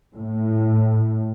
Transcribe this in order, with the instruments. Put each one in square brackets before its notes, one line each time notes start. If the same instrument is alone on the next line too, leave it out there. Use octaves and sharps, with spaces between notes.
[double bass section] A2